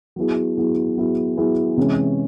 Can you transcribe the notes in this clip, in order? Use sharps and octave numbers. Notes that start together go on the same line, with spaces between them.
F#3 B3 E4 G#4
F#3 B3 E4 G#4
F#3 B3 E4 G#4
F#3 B3 E4 G#4
C3 E3 G#3 C#4